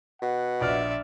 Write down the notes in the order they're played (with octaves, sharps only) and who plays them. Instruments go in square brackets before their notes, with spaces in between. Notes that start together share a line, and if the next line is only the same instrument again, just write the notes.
[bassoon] B2 [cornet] F#5
[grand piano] A#1 F6 [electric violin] D5 E5